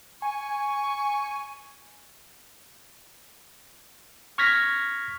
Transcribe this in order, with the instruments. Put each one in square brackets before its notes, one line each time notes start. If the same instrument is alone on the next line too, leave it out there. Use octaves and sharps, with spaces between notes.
[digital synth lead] G#5 [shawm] C#6
[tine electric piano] C#6 F6 G#6 A#6 B6